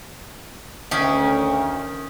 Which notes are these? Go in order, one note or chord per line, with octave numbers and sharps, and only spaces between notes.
D2 D#3 C#4